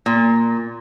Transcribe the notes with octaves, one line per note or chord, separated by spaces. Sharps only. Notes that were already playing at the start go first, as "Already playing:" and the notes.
A#2